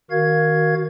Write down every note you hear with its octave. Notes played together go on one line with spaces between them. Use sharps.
D#3 F#4 A#4 F5 G#6